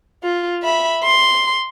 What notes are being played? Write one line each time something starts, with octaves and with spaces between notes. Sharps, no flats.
F4
E5 B5
C6